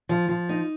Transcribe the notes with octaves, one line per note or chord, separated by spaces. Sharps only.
F3
F3
D#4